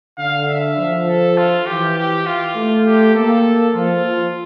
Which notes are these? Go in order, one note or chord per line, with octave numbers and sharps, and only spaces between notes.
D3 F5
E5
F3
A4
F4
E3 G4
G4
F4
A3
G4
A#3 A4
F3 F4
F3